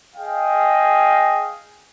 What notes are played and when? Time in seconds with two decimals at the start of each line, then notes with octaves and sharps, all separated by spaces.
0.16 G#4 D#5 F5 G5